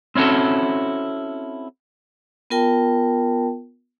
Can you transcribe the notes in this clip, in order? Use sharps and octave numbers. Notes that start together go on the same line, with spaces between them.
C4 C#4 E4 F#4 A4
B3 F4 A#4 G5 A5